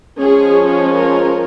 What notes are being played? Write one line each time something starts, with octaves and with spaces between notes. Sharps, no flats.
F3 G#3 C#4 G#4
A#4